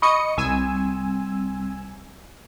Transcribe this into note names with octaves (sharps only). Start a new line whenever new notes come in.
D#5 B5 C#6 D#6 C#7
C2 G3 C4 G#5 E6